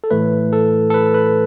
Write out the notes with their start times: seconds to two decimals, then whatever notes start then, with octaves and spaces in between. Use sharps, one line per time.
0.04 A4
0.10 A2 E3 A3 B4
0.53 A4
0.90 A4
0.94 B4
1.14 B4